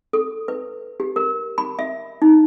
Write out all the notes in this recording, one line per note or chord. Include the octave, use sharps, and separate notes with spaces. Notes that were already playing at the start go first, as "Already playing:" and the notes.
A4
B4
G4
A#4
B5
E5
D#4